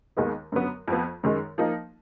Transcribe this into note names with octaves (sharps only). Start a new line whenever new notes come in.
D#2 D#3 G#3 B3 D#4
F#2 D3 F#3 B3
F2 F3 B3
F#2 D#3 G#3
F3 A#3 D#4